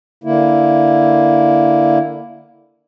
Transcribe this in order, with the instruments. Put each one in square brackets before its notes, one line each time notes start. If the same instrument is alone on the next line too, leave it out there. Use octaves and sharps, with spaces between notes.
[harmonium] D3 A#3 E4